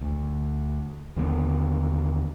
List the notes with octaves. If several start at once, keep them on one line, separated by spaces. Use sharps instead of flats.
D2
D#2 D3 G3 B3